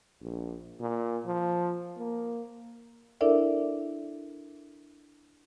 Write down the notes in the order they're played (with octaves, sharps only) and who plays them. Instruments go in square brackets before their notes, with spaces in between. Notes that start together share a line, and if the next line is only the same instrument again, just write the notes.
[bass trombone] A#1
A#2
F3
A#3
[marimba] D4 E4 A4 A#4 D5 E5